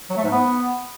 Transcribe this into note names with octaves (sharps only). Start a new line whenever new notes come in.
F#3
A3
G#2
B3